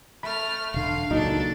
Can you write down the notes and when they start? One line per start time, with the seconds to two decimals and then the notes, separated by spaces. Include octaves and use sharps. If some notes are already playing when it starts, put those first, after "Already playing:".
0.23 A3 B5 F6
0.74 E1 D3 F5
1.11 C#2 A#2 F#3 D4 D#4 A4